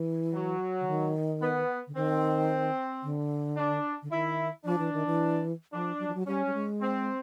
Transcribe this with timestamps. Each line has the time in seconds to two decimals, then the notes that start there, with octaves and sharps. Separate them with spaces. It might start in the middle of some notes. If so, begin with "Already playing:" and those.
Already playing: E3
0.34 F#3
0.81 D3
0.87 D#3
1.42 B3
1.87 D3
1.95 D#3 C4
3.03 D3
3.57 D4
4.03 D3
4.11 D#3 E4
4.65 F3 D4
4.79 E3
4.93 D#3
5.06 E3
5.73 F3 D4
5.99 F#3
6.08 F3
6.15 F#3
6.27 G3 C#4
6.46 G3
6.54 G#3
6.81 C4